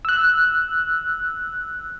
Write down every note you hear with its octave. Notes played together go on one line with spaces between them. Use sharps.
E6 F#6